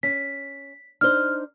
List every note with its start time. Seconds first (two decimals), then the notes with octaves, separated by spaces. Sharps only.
0.03 C#4 B6
1.01 D4 D#4 C5 F6